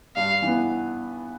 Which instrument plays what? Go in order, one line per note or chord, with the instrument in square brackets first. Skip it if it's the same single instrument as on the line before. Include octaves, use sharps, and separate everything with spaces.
[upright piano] G2 [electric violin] F5
[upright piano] E3 B3